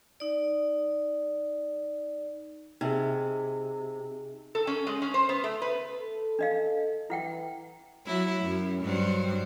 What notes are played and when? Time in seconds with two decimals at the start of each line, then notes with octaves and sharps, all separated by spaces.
0.20 D#4 D5
2.81 C3 D#4 G#4
4.55 A4
4.67 C#4
4.87 G#3
5.02 C#4
5.14 C5
5.29 B3
5.44 A3
5.62 B4
6.01 A4
6.39 D4 D#5 F5
7.10 E3 E4 F#5 G5
8.06 F#3 E4
8.44 F#2
8.82 G2 F#3 C5